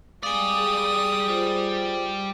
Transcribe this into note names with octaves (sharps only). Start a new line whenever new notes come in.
G3 G#3 D5 F5 G#5 D#6
G#4
F4 C5